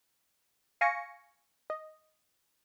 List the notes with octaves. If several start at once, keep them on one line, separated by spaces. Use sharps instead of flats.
F5 G#5 C#6 A#6 C#7
D#5